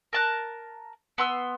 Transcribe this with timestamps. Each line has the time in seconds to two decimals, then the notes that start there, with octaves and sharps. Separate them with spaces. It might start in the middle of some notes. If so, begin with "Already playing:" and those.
0.13 A#4 A5 F#6
1.18 B3 C6 E6